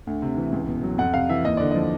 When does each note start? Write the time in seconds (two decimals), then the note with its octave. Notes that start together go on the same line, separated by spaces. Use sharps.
0.07 D2
0.22 C3
0.37 E3
0.52 C#2
0.68 B2
0.83 F#3
0.98 F2 F#5
1.14 C3 F5
1.29 E3 E5
1.44 D#2 D#5
1.57 D3 D5
1.71 F3 D#5